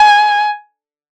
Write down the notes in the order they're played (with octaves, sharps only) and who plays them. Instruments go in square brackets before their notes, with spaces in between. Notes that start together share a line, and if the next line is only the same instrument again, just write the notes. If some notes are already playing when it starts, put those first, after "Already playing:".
Already playing: [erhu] G#5